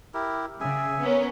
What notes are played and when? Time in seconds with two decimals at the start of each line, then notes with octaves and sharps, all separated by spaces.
0.14 E4 G4 A#4
0.61 C#3 G#4 E5 G#5
1.01 B3 C#4 A#4